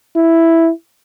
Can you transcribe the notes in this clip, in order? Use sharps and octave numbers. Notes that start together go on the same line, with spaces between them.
E4